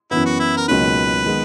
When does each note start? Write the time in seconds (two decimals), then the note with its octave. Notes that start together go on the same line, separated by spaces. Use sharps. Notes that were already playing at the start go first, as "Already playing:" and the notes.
0.11 F#2 E3 B3 E4
0.26 F#4
0.40 E4
0.57 A#4
0.68 C#2 B2 F#3 A#3 D#4 B4
1.25 D#3 G#3 B3